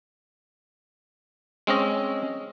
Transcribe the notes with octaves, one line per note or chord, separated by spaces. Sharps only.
G#3 C4 C#4 D#5